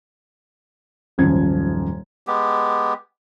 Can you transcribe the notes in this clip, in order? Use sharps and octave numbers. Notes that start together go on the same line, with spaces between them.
D#1 G#1 F#2 F3 G#6
G#3 B3 G4